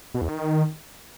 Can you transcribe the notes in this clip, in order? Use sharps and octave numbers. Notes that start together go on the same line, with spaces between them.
B2
E2
D#3